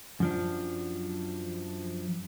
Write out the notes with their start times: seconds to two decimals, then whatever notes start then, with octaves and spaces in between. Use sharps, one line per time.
0.20 F#2 F3 D4